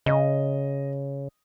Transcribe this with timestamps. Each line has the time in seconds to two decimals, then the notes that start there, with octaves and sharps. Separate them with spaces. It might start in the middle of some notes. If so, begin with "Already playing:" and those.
0.06 C#3 D#5